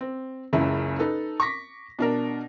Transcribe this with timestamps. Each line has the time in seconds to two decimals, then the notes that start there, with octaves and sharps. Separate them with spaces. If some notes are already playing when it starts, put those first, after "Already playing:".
0.01 C4
0.53 F#1 C#2 C#3 E4
0.99 D#4 A4 B4
1.40 C#6 D6 A#6 B6
1.99 B2 D4 A#4